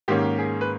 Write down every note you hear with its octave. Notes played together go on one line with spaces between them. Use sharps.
G#2 D#3 A#3 C#4 G4
G#4
B4